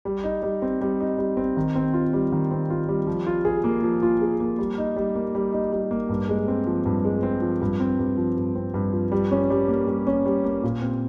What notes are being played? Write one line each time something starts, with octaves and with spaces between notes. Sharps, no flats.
G3
D#4
G3
C4
G3
D#4
G3
C4
D#3
C4
F4
G3
D#3
C4
F4
G3
F3
F4
G#4
A#3
F3
F4
G#4
A#3
G3
D#4
G3
A#3
G3
D#4
G3
A#3
G2
G#3
C4
F3
G2
G#3
C4
F3
G2
C4
G2
F3
G2
C4
G2
F3
G3
C#4
G3
A#3
G3
C#4
G3
A#3
A#2
C4